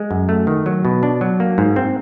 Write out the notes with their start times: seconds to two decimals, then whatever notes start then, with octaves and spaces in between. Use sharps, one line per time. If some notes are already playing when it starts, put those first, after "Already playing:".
Already playing: G#3
0.11 F#2
0.29 A3
0.47 D#3
0.66 F#3
0.85 B2
1.03 D4
1.21 F#3
1.40 A#3
1.58 G#2
1.76 C4